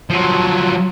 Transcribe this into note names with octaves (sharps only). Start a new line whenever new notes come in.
F3 F#3